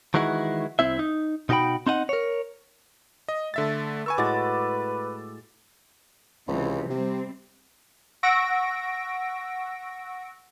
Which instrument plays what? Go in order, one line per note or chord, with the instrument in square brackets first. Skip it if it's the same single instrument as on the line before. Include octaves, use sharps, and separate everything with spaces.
[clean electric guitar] D#3 E3 G#3 E4 F#4
C2 C4 E4 E5
D#4
B2 D#4 F#4 A4 G5 B5
C4 D#4 E4 D#5 F#5
A#4 C#5
[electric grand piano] D#5
[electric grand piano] D3 E5 A6 [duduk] A3
[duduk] B4 [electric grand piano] G#5 C#6 E6
[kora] A2 G#3 F#4 [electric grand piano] D6 A6
[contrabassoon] C#2 [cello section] C3 E3
[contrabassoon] C3 [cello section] G3 C4
[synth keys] F#5 C#6 E6 A#6 D7